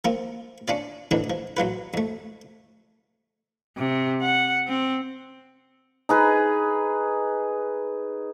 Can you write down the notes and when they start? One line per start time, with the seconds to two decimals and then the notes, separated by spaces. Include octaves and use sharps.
0.05 F3 A#3 C4 F4
0.68 C#4 D4 F4 D5
1.11 F2 A2 D3 E3 D4 D#4
1.30 F3
1.57 A1 F#3 F4 B4
1.94 F2 A3
3.77 C3
4.21 F#5
4.67 C4
6.09 D#4 G#4 B4